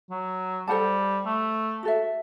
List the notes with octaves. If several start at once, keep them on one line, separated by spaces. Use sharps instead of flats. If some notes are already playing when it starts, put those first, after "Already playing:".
F#3
G3 A4 C5 F#5 A5
A3
F#4 A4 E5